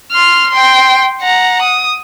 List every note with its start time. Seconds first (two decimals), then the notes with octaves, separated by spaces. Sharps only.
0.12 C6 F6
0.51 G5 C6
1.21 F#5 A#5
1.62 D#6